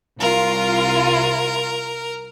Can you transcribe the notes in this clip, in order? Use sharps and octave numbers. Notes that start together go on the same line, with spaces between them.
C2 F4 A#4